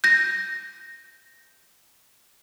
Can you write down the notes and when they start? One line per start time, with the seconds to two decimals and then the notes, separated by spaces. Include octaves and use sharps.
0.04 G6 A#6